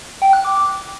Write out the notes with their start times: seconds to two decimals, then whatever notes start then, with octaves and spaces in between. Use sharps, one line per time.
0.22 G5
0.33 F#6
0.45 D6